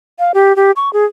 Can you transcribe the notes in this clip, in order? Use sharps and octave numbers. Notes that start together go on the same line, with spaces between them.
F5
G4
G4
C#6
G#4